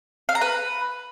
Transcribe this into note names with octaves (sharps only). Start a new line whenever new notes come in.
F5
A#5
B4